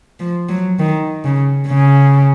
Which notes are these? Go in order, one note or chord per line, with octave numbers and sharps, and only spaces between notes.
F3
F#3
D#3
C#3
C#3